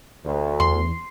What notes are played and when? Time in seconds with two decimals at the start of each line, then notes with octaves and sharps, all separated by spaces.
0.24 D2
0.60 E2 C6